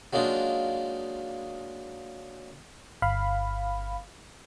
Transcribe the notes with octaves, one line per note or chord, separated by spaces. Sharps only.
F#3 G#3 A#3 D4 D#4 F4
G1 F5 B5